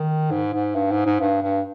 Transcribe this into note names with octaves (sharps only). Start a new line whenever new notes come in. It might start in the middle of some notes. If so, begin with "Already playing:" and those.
Already playing: D#3
G#2
G#2
G2
G#2
G#2
G2
G2